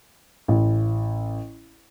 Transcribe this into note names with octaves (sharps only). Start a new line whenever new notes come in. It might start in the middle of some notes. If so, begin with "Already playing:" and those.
A1